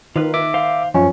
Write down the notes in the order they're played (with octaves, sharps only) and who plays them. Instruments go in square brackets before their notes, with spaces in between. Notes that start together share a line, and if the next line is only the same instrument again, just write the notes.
[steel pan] D#3 [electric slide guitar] F4 B4
[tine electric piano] E5 D6
[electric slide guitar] C5 F5
[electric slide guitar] F#2 [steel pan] F3 [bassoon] C#4